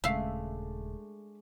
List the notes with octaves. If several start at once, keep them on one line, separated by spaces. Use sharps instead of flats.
D#1 C#3 G#3 A3 D4 E5 F5